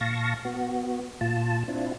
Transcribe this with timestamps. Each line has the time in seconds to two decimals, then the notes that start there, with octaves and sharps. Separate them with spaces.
0.01 A#2 F5 A5 C#6 A#6
0.45 B3 F#4
1.21 A#2 F4 A5
1.68 C4 D4 E4 F4